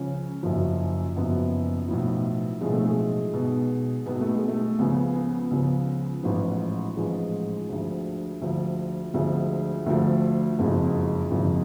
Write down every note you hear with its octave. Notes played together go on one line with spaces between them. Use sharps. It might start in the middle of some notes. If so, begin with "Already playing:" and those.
Already playing: C#2 C#3 F3 C#4
F#1 F#2 F3
F#1 F#2 F3 B3
B1 A2 F3
B1 A2 F3 G#3
A3
G#3
B1 B2
B1 B2 B3
A3
G#3
A3
C#2 C#3 F3 B3
B3
C#2 C#3 F3
A1 G#2 F3
A1 G#2 F3 G#3
D2 D3 F3
D2 D3 F3
D2 D3 F3 G#3
D2 D3 F3 A3
F#1 F2 F3 G#3
F#1 F2 F3